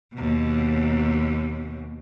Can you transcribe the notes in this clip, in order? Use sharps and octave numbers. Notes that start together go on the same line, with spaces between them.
D#2 B2